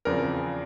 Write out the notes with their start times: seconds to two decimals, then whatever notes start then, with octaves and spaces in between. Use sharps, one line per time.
0.05 E2 C#3 F3 C4 A#4